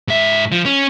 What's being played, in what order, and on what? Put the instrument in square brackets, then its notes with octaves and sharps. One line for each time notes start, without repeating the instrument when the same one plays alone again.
[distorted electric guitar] G#2 E5
F3
C#4